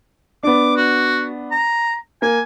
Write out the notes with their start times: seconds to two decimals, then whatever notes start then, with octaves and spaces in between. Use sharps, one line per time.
0.43 B3 D4 D6
0.76 F#4
1.52 A#5
2.22 A#3 G#5